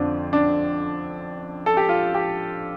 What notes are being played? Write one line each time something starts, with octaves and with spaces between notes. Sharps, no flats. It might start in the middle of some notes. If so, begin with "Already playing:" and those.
Already playing: F2 D3 F3 C4 D4
D4
A4
G4
F4
G4